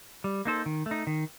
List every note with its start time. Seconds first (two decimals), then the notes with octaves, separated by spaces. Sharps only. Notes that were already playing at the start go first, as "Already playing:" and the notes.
0.24 G3
0.45 A#3 D#4 A4 C5
0.66 D#3
0.86 A3
0.91 D#4
1.07 D#3